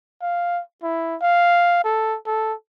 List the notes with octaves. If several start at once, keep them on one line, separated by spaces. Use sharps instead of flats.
F5
E4
F5
A4
A4